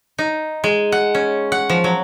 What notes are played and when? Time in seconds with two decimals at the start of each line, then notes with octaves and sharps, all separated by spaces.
0.19 D#4
0.64 G#3
0.92 F#5
1.15 C#4
1.52 F#5
1.69 F3
1.84 F#3